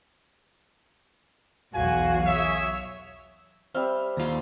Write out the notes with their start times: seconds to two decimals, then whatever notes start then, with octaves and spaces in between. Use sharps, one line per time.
1.75 B1 E2 F#4 F5 G#5
2.27 G#4 C#5 E5
3.74 G3 C4 E5 F5
4.17 D#2 F4